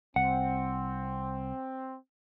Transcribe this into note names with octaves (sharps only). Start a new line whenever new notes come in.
C2 C4 F#5